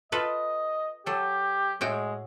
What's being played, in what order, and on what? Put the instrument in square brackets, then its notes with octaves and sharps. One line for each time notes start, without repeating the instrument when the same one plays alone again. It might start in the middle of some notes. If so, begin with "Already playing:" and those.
[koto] F4 A4 B4 [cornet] D#5
[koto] F#3 A4 [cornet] G4
[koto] A2 F#4 G5 [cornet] G#3